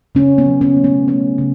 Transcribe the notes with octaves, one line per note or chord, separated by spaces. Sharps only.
C#3 C#4
B3
F#3
C#4
A3
B3
A3 C#4
C#3